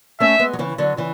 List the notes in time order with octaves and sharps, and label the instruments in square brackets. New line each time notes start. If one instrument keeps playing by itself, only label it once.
[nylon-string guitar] A3 C#4 [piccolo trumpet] E5
[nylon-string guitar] G#3 B3
F#3
C#3 E3
D3 F#3
C#3 E3